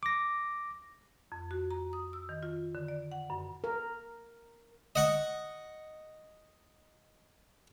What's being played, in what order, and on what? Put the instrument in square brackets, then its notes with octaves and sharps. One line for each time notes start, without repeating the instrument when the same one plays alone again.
[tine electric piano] D6 A#6
[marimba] F2
F#4
A#5
D#6
E6
D#3
F4
D3
D5
F#5
F#2
[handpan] A#4
[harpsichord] D#5 F#5 C#6